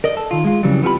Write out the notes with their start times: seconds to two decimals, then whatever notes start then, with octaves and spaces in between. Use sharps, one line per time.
0.04 A#4 D5 D#5
0.17 A4
0.31 D#3 F4
0.45 G#3 F4
0.63 F2 C#3 E3 F#3 G3
0.83 B3 C4 F4 G4 G#5 B5